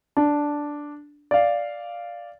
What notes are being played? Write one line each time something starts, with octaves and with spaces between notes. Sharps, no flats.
D4
D5 F5